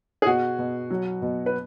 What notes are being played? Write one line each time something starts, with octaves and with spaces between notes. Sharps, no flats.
G#4
B2 F#4
B2
F#3
B2
B4